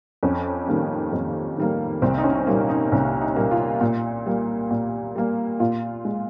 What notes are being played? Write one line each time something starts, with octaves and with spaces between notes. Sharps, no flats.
F2 C#4
D#3 G3 A#3
F2
D#3 G3 A#3
C2 C4
D#4
C#4
A#2 G3 A#3 D#4
D#4
C2 C#4
D#4
A#2 G3 A#3
F4
A#2
G3 A#3
A#2
G3 A#3
A#2 F4
G#3